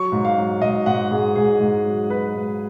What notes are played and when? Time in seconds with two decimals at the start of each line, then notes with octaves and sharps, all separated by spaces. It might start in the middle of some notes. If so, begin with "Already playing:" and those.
Already playing: F#3 C#6
0.12 G#2
0.25 F5
0.37 F#3
0.62 G#2 D#5
0.86 G#2 F#5
1.11 G#2 G#4
1.36 G#2 G#4
1.60 G#2
1.85 F#3
2.09 F#3 B4
2.35 G#2